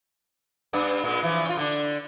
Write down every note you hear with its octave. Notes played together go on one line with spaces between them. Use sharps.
G2 B3 D4
A#2 G#3
E3 F3
C#4 F4
D3 D4